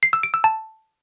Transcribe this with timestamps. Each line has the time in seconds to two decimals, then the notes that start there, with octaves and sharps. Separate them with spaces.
0.03 C7
0.13 E6
0.23 D7
0.34 E6
0.44 A5